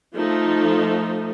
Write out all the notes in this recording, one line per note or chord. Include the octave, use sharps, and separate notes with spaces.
F3 A3 D#4